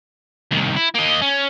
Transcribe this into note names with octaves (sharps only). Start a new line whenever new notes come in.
C2 D#3
E4
A#3 D#5
C#4